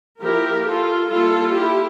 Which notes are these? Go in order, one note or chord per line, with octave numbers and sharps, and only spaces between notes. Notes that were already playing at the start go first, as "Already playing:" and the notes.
F3 A#3 E4 G4 A#4
F4 A4
G3 A#3 E4 F4 A4
E4 G4